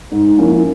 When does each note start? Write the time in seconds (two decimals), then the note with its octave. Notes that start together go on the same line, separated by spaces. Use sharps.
0.12 G#2
0.37 F3 A#3 C#4 E4